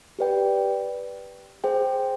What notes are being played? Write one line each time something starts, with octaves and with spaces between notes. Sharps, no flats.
G4 B4 D5 G5
G#4 C5 G5